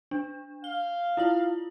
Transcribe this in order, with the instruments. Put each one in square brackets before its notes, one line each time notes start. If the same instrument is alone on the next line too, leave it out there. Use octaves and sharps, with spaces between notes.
[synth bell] D4
[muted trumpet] F5 [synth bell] G7
[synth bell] E4 F4 F#7